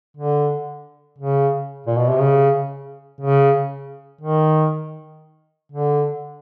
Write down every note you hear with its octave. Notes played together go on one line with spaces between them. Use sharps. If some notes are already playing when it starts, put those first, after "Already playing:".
D3
C#3
A#2
B2
C3
C#3
C#3
D#3
D3